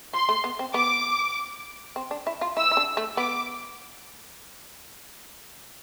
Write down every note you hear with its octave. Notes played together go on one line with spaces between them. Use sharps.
F3 C6
A3
B3
C4
B3 D6
C4
D4
E4
F4
E4 E6
E4
D4
A3
B3 D6